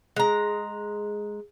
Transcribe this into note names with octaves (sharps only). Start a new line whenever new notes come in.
G#3 A#5